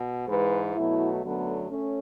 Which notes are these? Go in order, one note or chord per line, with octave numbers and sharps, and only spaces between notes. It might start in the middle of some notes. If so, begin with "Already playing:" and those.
Already playing: B2
G#2 E3 G#3 B4
B2 F#3 A3 E4
F#2 D3 F#3 A3 B3
A3 C#4